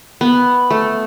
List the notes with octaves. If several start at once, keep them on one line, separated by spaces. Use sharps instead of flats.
B3
A3